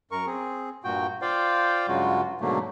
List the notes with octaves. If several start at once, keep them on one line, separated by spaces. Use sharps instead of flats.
F#2 A#4 C#6
C4 G#4
G2 A#2 F#4 G5
F4 C5 D5 F5 G5
G2 C#3 F#3 G#3 F4 F#4
G#2 B2 D3 F#3 A3 A#3